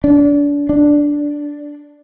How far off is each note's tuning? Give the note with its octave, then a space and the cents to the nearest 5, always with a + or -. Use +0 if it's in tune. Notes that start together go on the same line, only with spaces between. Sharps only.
D4 -30
D4 -5